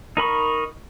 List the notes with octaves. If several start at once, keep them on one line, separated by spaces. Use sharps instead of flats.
D#4 A#4 B5 C#6